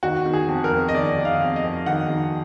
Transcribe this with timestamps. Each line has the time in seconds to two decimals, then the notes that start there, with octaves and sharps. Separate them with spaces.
0.03 D#3 F#4
0.25 D#3
0.33 G#4
0.48 F2
0.64 A#4
0.72 F2
0.89 D#5
0.94 D#3 D5
1.17 D#3
1.25 F5
1.41 F2
1.56 D#5
1.64 F2
1.86 D#3 F#5
2.09 D#3